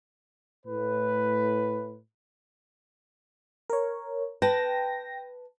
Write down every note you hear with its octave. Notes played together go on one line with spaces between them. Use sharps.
A2 B4
A#4 C#5
B4 G5 A5 A#6